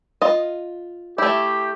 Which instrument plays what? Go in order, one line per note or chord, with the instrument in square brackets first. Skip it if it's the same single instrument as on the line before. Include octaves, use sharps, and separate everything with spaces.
[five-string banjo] F4 D#5
[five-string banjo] A3 E4 [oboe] G4